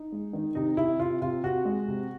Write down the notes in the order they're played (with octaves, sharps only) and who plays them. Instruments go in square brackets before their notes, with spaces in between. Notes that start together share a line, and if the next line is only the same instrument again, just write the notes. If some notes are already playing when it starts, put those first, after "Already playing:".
Already playing: [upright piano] D#4
G#3
D#3
C3 D#4
C3 E4
C3 F4
C3 F4
C3 F#4
G#3
C3